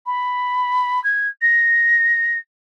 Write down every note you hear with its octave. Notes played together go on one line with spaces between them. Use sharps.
B5
G#6
A#6